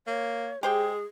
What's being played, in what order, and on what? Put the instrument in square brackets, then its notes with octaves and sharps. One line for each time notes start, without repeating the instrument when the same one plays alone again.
[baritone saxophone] A#3 [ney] C#5
[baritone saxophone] G#3 [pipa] G4 C5 G5 [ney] G#4